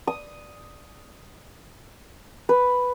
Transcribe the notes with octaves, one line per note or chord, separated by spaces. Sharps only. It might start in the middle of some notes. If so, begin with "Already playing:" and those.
D#6
B4